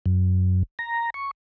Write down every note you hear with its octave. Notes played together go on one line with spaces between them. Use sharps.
F#2
A#5
C#6